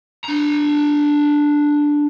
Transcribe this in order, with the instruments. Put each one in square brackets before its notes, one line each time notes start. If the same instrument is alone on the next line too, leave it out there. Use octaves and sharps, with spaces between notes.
[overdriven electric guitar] D4 A#5